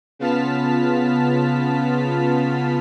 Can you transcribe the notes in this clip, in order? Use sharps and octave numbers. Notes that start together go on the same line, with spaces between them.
C#3 B3 F4 A5 F6 B6